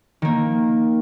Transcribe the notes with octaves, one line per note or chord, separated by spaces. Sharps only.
D#3 A#3